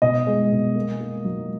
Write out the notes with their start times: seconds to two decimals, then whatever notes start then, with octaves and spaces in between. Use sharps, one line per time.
0.02 B2 D#5
0.27 G#3
0.52 B2
0.76 A#3
1.00 A#3
1.25 F#3